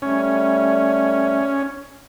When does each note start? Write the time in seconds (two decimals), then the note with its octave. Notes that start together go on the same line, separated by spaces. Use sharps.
0.02 G3 A3 C#4